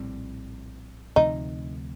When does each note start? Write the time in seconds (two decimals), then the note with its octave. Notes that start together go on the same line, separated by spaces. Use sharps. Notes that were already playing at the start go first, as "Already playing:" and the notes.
Already playing: A#1 A2 G3 C4
1.16 D2 C3 F3 A3 D#4